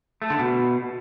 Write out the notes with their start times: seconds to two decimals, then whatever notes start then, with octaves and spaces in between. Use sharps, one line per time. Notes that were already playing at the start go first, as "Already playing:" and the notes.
0.22 A3
0.30 D3
0.39 B2